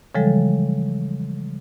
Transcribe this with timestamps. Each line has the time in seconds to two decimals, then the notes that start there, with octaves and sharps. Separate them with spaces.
0.15 C#3 E3 F3 G3 G#3 A4